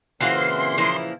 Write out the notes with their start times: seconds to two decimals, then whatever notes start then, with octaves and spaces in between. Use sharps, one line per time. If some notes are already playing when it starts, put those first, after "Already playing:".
0.21 A#2 C#3 E3 C4 F#4 F5 C6
0.78 F3 A#3 E4